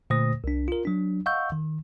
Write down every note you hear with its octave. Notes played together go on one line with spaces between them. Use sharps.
A#2 D3 A3 C5 D#6 A#6
C2 D4
F4 A#4
F#3 D4
D#5 F5 F#5 C#6 E6 G6
D#3